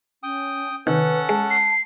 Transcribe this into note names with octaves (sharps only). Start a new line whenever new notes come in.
C#4 G5 D#6
C3 D#3 C#4 A4 B4 F#5
G#3 A5
C7